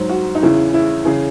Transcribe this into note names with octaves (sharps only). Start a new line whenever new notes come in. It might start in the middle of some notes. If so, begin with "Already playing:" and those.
Already playing: G#2 F#3 C5
F#4
D#4
E2 C#3 E3 E4
E4
C#3 E3 G#4